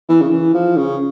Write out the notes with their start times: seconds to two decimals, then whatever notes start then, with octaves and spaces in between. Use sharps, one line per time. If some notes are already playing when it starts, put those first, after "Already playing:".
0.09 E3
0.22 C#3
0.30 E3
0.54 F3
0.76 C#3